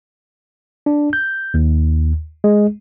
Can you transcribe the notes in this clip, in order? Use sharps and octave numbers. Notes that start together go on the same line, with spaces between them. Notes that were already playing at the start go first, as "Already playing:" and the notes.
D4
G6
D#2
G#3